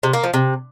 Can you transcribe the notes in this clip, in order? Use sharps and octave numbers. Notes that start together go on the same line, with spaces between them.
C3
A#3
F3
C3